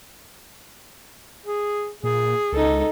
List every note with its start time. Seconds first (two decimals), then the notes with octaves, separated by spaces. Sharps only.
1.46 G#4
2.03 A#2 G#4
2.52 C#2 D#4 A4